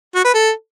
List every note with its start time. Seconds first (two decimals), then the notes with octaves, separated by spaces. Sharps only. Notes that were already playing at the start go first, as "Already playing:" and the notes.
0.15 F#4
0.25 B4
0.34 A4